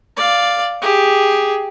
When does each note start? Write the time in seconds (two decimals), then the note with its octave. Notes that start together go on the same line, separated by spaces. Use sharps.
0.16 D5 F5
0.82 G4 G#4